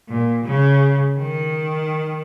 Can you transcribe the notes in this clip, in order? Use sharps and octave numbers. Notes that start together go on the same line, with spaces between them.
A#2
C#3
D#3